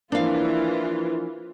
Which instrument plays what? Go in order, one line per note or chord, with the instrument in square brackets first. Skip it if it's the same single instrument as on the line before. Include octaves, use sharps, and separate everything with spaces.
[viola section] E3 F4 [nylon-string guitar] F3 A#3 [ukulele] D4 F5